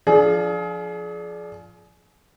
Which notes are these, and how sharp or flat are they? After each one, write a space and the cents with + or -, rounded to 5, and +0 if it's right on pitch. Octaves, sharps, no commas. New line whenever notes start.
F3 +0 D4 +0 G#4 +35